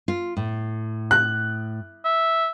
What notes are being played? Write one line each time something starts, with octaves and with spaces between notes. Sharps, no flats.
F4
A2
F#6
E5